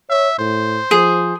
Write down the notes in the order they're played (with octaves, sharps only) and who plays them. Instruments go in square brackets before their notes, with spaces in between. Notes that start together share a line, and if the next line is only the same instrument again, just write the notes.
[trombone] C#5 [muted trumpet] E5
[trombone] A2 [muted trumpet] C5
[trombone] F3 [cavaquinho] G#4